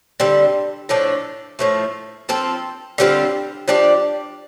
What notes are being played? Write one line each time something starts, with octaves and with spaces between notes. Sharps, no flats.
D3 G3 C4
A2 F3 D4 A4
A2 F3 A3
F3 C4 A4
D3 G3 C4 F4
F3 D4 G4 D5